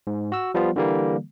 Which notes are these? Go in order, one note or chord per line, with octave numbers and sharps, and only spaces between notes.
G#2
F#4 E6
F3 G3 B3 F4
D3 E3 G3 A#3